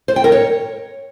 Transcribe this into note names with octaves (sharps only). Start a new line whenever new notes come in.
C5
G5
A#4
C#5